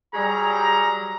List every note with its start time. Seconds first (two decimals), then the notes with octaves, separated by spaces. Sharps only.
0.14 F#3 G3 G#4 A#5